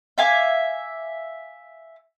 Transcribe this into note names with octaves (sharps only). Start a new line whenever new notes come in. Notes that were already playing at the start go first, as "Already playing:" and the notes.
E5 F5 G#5 D6